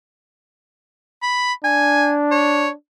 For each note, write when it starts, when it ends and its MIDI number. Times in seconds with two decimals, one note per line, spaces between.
1.22 1.53 83
1.65 2.75 62
1.65 2.12 80
2.31 2.69 73